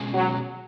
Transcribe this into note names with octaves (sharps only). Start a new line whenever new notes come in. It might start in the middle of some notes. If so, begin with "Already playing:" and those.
Already playing: B2 G#3 C#4 G#4
F#3